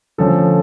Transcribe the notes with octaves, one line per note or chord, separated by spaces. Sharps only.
D3 F3 A3 C#4 A4